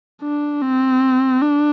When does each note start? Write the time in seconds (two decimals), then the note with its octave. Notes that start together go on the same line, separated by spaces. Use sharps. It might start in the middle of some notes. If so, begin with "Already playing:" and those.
0.22 D4
0.62 C4
1.42 D4